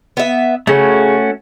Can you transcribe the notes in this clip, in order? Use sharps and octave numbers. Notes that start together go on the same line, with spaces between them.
B3 E5
C#3 A3 C#4 F#4